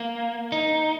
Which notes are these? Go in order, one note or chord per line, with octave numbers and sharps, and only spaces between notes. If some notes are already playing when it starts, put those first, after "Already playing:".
Already playing: A#3
D#4